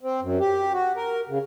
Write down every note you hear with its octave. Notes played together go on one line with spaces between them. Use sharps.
C4
F#2
G4
F#4
A#4
C#3